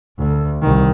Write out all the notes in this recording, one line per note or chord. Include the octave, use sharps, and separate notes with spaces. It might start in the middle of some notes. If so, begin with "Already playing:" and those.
D2
C2 D#3